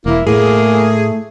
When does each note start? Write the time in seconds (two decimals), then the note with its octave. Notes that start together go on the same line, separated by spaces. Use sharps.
0.06 E1 E3 A#3 E4
0.27 A2 A3 A#3 G#4